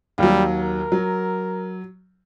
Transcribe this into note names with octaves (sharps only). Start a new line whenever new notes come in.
D#2 F#3 G3
A#4
F#3